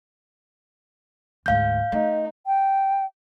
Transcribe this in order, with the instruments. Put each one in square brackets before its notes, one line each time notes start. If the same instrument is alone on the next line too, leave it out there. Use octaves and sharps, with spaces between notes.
[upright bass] D2 G#2 [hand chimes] F5 G6
[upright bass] A3 [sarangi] D#4
[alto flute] G5